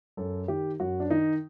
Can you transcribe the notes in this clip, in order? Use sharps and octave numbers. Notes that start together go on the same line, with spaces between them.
F#2 A4
D#3 G4
F#2 F#4
D4
D#3 D#4